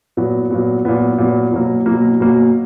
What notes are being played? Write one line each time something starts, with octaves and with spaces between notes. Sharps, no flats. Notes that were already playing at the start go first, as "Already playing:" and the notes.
A#2 F#3 B3
A#2 F#3 B3
A#2 F#3 B3
A#2 F#3 B3
B2 F#3 A#3
B2 F#3 A#3
B2 F#3 A#3